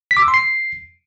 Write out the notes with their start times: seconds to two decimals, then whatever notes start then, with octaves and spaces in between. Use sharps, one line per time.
0.11 B6
0.17 D6
0.22 E6
0.28 C6
0.34 C7